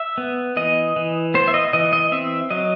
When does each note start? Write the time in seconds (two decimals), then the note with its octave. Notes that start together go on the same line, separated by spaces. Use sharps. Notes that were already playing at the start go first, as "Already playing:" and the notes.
Already playing: E5
0.18 B3
0.57 E3 D#5
0.96 E3
1.34 B3 C5
1.48 E5
1.54 D#5
1.73 E3 D#5
1.93 D#5
2.12 C4 E5
2.51 F#3 D#5